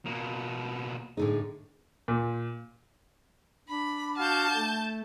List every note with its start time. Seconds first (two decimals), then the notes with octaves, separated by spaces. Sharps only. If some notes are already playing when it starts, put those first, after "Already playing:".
0.06 B2 A#3
1.17 A2 D3 D#4 G#4
2.08 A#2
3.69 D4 B5
4.18 F#4 F5 A5 G6
4.56 A3